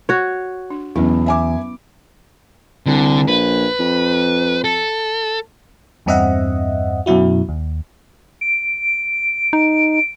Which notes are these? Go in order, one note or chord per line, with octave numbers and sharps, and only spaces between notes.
F#4 C#5
D4
B1 E2 F#3 C#4 E4
E5 G#5 D6
C2 D3
A#1 B4
F2
A4
E2 G2 C4 D#5 E5 F#5
F#2 B2 F#3 E4 F#4
D#2
D7
D#4